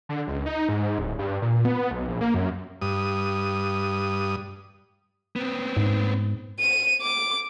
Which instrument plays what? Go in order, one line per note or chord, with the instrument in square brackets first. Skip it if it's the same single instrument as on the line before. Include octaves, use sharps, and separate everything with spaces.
[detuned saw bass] D3
C#2
D#4
G#2
D1
G2
A#2
B3
B1
A#1
A#3
F#2
[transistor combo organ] G2 D#6
[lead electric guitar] B3 C4
[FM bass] G#2
[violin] D#7
D6